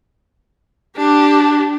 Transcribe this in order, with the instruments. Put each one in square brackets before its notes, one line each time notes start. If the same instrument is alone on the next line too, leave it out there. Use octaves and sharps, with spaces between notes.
[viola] D4 G4